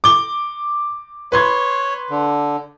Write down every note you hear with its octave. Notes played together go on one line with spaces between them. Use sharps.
D6 G7
B4 C#5 C6 G#6
D3